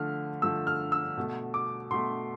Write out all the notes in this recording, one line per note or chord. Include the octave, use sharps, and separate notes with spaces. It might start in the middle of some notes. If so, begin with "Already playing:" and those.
Already playing: D3 F3 A3 F6
D3 F3 A3 E6
F6
E6
B2 A3
D6
B2 A3 C6